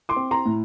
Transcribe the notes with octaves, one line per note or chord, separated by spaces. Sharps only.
C6 D6
C4
A#5 C6
A2